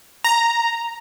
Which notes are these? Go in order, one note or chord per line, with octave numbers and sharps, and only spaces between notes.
A#5